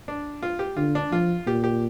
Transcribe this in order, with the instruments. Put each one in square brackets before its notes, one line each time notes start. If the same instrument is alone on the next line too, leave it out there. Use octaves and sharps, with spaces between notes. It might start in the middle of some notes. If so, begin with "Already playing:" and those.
[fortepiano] D4
F4
G4
[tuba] D3 [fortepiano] F4
[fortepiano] D4
[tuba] F3 [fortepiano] F4
[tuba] A#2 [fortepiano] G4
[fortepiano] G4